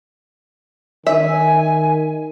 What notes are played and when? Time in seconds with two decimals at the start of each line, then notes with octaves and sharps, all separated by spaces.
1.07 D#3 E5 G#5